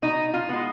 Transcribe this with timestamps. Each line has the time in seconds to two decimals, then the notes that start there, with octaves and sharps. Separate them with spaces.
0.02 B2 D#4
0.34 F4
0.49 G#3 B3